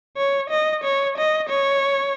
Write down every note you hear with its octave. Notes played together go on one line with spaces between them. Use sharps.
C#5
D#5
C#5
D#5
C#5